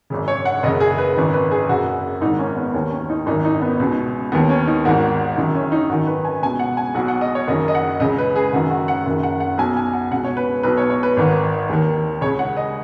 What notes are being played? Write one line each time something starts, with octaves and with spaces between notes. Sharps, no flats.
G#1 F#2 C#3
C#5
F#5
F#1 F#2 C#3 D#5
G#4
B4
G#1 F#2 D#3
B4
G#4
F#1 F#2 C#3 F#4
G#1 G#2 D#3 D#4
C#4
B3
D#2 D#3 C#4
C#4
D#4
G#1 F#2 D#3 D#4
D#4
B3
C#2 B2
D#2 D#3 B3
C#4
D#4
G#1 G#2 D#3 F#4
F#1 F#2 D#3 D#4
C#4
D#4
G#1 F#2 D#3 F#4
B4
G#5
C#2 B2 G#5
F#5
G#5
B1 B2 F#5
F#5
D#5
C#5
F#1 F#2 D#3 D#5
D#5
F#5
C#2 C#3 D#5
B4
G#4
F#1 F#2 D#3 F#4
F#4
F#5
F#1 F#2 D#3
F#5
F#5
B1 B2 G#5
G#5
F#5
C#2 B2 F#5
C#5
B4
B1 B2 B4
C#5
C#5
B4
G#1 G#2 D#3
D#2 D#3
C#2 C#3 C#5
F#5
D#5